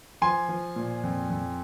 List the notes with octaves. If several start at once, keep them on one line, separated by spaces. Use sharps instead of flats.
F3 G#5 C6
F3
A#2
F2
F2